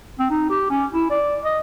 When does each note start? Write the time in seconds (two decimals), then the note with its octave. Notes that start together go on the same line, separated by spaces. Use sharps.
0.19 C4
0.31 D#4
0.50 G4
0.70 C#4
0.93 E4
1.10 D5
1.45 D#5